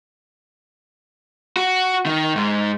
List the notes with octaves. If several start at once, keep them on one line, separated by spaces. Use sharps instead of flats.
F#4
D#3
G#2